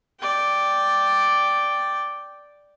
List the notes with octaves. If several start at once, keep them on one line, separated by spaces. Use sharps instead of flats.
D5 G5